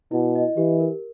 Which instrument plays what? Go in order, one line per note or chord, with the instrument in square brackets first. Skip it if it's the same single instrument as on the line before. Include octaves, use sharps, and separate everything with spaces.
[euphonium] B2 [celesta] E4
[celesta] D#5
[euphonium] E3 [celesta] G4
[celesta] A#4